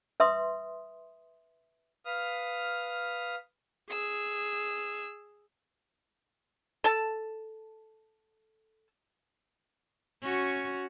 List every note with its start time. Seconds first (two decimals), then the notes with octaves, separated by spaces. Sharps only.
0.20 B4 E5 C6 D#6
2.05 B4 F5 D#6 F6
3.90 G#4 E6
6.84 A4 A5
10.22 C#4 F#4